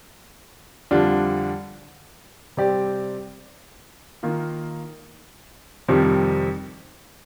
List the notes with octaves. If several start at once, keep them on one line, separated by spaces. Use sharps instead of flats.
F2 D3 G3 D4 F4
C3 G3 C4 G4 D5
D#3 A#3 F4
F2 C3 D#3 G3